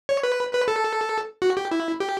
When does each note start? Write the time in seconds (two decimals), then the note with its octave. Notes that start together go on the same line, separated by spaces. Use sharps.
0.09 C#5
0.23 B4
0.53 B4
0.68 A4
1.42 F#4
1.57 G4
1.71 E4
2.00 G4